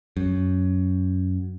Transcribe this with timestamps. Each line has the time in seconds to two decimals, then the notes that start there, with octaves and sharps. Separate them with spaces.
0.17 F#2